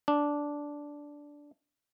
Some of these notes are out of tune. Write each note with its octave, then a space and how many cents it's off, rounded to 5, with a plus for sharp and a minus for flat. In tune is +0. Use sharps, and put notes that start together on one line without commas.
D4 -10